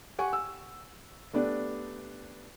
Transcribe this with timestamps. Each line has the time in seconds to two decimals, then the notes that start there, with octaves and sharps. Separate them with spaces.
0.18 G4 F#5 G#5 C#6
0.33 E6
1.33 A3 B3 D4 G4 D5